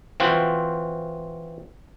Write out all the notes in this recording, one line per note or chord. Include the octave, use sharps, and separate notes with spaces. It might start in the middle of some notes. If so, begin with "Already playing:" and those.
E3 C4 F4 F#4 C5